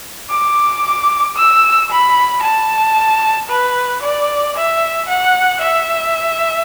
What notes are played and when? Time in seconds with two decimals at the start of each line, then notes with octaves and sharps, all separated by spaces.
0.30 D6
1.36 E6
1.90 B5
2.43 A5
3.49 B4
4.02 D5
4.56 E5
5.08 F#5
5.61 E5